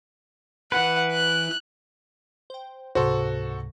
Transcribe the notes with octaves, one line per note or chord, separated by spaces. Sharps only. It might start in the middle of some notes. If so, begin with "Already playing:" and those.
E3 B4 F#5
F#6
C5 G5
C#2 G#2 C3 F#4 A4 C5 C#6